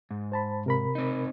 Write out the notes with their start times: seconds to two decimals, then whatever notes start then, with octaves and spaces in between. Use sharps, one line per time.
0.11 G#2
0.32 C5 A5 B5
0.66 C3 A#4 B5
0.95 C4 D#4